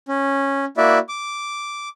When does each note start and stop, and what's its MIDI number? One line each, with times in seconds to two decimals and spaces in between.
0.09 0.65 61
0.77 0.98 58
0.77 0.98 64
0.77 0.98 66
0.77 0.98 74
0.77 0.98 76
1.09 1.89 86